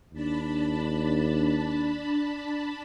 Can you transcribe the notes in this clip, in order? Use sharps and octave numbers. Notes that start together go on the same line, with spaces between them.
D#2 D4 A5 B5